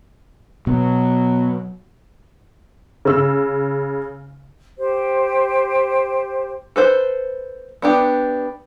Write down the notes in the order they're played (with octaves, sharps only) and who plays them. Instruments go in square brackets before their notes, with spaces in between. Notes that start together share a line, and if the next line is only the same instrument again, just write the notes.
[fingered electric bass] B2 B3 [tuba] F#3
[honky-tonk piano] C#3 E6
[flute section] G4 C5
[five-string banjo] A4 B4 C5
B3 D4 G4